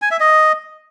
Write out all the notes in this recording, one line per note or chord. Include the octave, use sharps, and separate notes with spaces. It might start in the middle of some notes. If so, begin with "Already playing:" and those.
G#5
E5
D#5